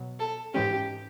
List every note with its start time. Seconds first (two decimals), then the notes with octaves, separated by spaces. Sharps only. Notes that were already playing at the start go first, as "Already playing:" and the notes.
Already playing: B2 F#3
0.19 A4
0.54 G#2 E3 G#3 C#4 G4